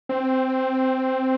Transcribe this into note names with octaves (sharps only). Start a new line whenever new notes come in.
C4